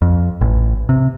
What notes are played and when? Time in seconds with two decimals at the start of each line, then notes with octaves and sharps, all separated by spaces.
0.02 F2
0.41 A1
0.89 C3